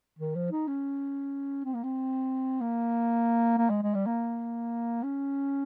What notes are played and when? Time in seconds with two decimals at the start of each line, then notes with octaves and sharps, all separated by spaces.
0.19 D#3
0.35 F3
0.52 D#4
0.68 C#4
1.65 C4
1.74 A#3
1.84 C4
2.61 A#3
3.58 A#3
3.70 G#3
3.83 G#3
3.94 G3
4.06 A#3
5.03 C#4